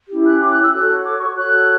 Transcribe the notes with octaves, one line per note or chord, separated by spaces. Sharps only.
C#4 E4 G4
F#6
D6
F#6
E6
F#4 A4 C#5 F#6
D6
C#6
F#4 A4 C#5 F#6